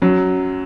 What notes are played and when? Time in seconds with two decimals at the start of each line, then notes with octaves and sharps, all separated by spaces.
0.02 F#2 F#3